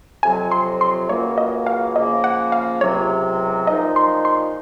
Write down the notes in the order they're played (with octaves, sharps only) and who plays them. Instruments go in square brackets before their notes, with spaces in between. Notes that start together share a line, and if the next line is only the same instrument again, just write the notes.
[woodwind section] F2 C3 F#3 [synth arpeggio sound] G#5
[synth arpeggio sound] C6
C6
[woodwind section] C#2 C#3 F#3 A#3 [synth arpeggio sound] C#5
[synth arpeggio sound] D#5
F5
[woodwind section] C#3 F3 A#3 [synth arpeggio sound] D#5
[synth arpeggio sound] F#5
F5
[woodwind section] C#2 C3 F#3 [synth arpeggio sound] C#5
[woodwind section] A#2 F3 G#3 D#4 [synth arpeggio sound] D#5
[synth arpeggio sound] C6
C6